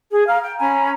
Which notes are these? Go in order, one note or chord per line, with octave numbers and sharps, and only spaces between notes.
G#4
F5 A#5 F6
G5
C#4 G#5 A#5 B5